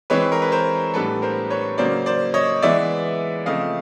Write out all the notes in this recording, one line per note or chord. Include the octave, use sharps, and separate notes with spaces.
E3 G#3 C4 B4 C#5
A#4
B4
A#4 C5
A2 E3 G3 B3 D4 A4 B4
A#4 C5
B4 C#5
C#3 F#3 A#3 C#4 C5 D5
C5 D5
C#5 D#5
E3 G#3 B3 D5 E5
C#3 F3 A3 C4 D#5 F5